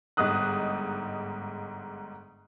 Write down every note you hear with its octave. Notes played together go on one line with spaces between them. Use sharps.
G1 G#2 D#5 D#6 F#6